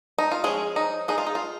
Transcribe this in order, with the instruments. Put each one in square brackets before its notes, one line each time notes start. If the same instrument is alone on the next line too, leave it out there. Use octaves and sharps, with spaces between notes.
[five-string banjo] D#4
F4
F3 G#3 C#4 G#4
D#4
G#3 D#4 G#4
F4
D#4
F4